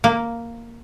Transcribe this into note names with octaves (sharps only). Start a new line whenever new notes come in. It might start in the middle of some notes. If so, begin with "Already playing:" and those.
A#3